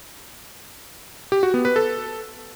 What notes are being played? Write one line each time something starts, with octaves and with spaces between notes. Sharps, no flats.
G4
F#4
B3
B4
A4